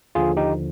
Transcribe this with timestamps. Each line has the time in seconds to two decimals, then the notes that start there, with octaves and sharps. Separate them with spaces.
0.15 D#2 D3 F3 F4 G#4
0.37 D#4 G4